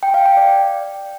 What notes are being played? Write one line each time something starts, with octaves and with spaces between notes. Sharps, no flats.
G5
F5
G5
D5